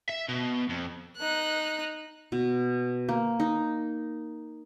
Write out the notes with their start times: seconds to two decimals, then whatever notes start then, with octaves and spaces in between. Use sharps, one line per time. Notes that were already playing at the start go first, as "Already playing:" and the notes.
0.09 E5
0.28 B2
0.69 F2
1.17 D#4 F#6
2.32 B2
3.09 A#3
3.40 D#4